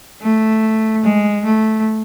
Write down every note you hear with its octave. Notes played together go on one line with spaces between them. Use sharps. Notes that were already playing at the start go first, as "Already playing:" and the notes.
A3
G#3
A3